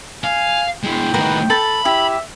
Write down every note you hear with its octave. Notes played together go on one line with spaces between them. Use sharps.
F5 G#5
G#3 E4 G5
A2 D#3 F#4 A#4 B4
A4 A5 B5
E4 G4 E5